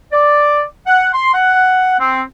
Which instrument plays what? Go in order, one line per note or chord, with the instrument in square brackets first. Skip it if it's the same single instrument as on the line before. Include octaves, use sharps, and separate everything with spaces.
[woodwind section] D5
F#5
C6
F#5
C4